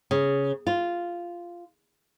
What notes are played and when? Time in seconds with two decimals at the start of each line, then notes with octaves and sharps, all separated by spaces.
0.11 C#3
0.67 F4